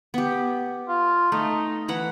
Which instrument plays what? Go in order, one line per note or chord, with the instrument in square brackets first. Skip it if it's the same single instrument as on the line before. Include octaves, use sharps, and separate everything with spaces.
[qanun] B3 G4
[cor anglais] F4
[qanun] A3 [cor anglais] D#4
[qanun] E3 B4 F#5